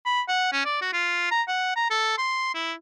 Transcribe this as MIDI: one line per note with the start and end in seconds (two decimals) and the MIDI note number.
0.05 0.21 83
0.28 0.48 78
0.52 0.64 61
0.65 0.79 74
0.81 0.88 66
0.93 1.29 65
1.31 1.42 82
1.48 1.73 78
1.76 1.89 82
1.90 2.16 69
2.18 2.50 84
2.54 2.73 64